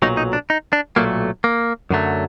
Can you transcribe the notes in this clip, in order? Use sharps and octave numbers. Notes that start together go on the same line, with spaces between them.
B1 A#2 F#3 D#4
D#4
D4
D#4
D4
B1 A#2 F#3 A3 A#3
A#3
F#2 D3 F#3 A3